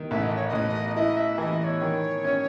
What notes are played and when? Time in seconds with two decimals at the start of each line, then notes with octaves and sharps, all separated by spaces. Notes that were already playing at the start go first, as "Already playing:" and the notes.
Already playing: D#3
0.11 A1 E5
0.23 D#5
0.35 C#5
0.48 A1 D#5
0.96 E4 D#5
1.17 E5
1.38 E3 D#5
1.60 D#5
1.64 C#5
1.81 D#3
2.24 C#4